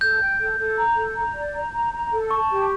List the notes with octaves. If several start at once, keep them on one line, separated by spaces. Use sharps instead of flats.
A4 G6
G5
A4
A4
A#5
A4
A#5
D5
A#5
A#5
A#5
A4
A5 C#6
G4